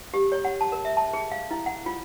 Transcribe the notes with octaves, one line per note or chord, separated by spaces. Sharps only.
G4
C#5
F#5
A5
A#4
E5
A5
G#4
F5
E4
F#5
F4